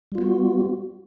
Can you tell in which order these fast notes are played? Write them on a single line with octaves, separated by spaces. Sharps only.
G3 F4 B3 F#4